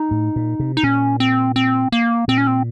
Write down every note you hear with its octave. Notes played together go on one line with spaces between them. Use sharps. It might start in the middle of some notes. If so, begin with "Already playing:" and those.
Already playing: D#4
A2
A#2
C3
D#4
A#2 C#4
C4
C4
A#3
A#2 C4
C#4
C4